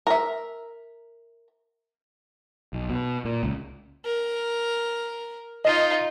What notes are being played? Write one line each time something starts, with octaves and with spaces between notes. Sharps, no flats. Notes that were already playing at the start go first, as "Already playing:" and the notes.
A#4 E5
B1
B2
A#2
C#2
A#4
D#4 F4 D#5